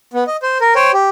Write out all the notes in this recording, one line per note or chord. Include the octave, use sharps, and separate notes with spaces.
B3
D#5
C5
A#4
C5 C#5 G5
G4